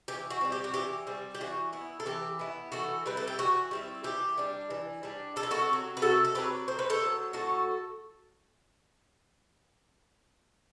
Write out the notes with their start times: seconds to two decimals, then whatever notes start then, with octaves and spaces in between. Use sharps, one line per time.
0.08 E3 G4
0.30 F#4
0.41 G3 C4
0.52 G4
0.64 F#4
0.74 E3 G4
1.07 G3 C4
1.35 G4
1.41 E3 F#4
1.73 B3 E4
2.00 A4
2.06 E3 G4
2.39 B3 E4
2.72 E3 F#4 A4
3.06 G3 C4 E4 B4
3.17 A4
3.27 G4
3.38 E3 F#4
3.71 G3 C4 E4
4.04 E3 G4
4.38 G3 D4
4.70 E3
5.03 G3 D4
5.36 C3 A4
5.43 B4
5.51 F#4 A4
5.69 F#3 C4
5.97 B4
6.02 C3 F#4 A4
6.24 A4
6.34 F#3 C4 G4 B4
6.68 A2 C5
6.79 B4
6.90 A4 C5
7.01 F#3 B3
7.33 A2 F#4 A4